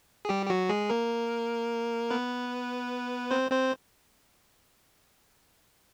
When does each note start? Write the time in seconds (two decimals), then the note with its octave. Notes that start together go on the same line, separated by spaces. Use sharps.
0.25 G#4
0.29 G3 G4
0.46 G4
0.50 F#3 F#4
0.69 G#3 G#4
0.90 A#3 A#4
2.10 B3 B4
3.31 C4 C5
3.51 C4 C5